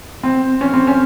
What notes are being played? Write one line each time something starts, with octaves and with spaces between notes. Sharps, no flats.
C4
C#4
C4
C#4